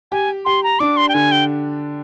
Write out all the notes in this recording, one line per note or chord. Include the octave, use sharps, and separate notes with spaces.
G4 G#5
G4 C6
A#5
D4 D6
C6
G5
D3 G#5
G5